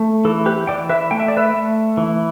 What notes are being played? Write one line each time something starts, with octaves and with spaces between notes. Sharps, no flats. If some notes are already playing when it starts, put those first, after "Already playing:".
Already playing: A3
E3 A4
G4 B4
E3 D5 G5
B4 E5
A3 G5
E5
D5
B4 E5
A3
E3